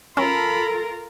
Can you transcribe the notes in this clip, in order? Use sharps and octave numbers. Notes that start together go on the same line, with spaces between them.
C#4 F4 A4 A#4 B5